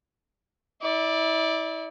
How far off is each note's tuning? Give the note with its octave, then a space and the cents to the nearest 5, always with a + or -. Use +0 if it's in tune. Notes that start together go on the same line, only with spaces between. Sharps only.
E4 -30 D5 +0